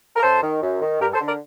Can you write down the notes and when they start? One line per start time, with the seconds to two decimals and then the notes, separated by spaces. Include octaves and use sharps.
0.16 A#4
0.22 F#2 A4 C5
0.42 D#3
0.62 F#2
0.81 D#3
1.00 G2 G4 A#4
1.14 A4 C5
1.20 D3
1.27 A#4 D5